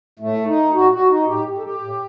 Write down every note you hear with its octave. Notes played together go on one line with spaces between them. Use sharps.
A2 A3
D#4
A#2 F#4
F#4
D#4
A2 G4
A4
G4
A2